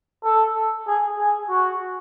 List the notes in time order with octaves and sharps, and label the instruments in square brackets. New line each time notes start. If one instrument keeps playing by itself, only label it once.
[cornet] A4
G#4
G#4
F#4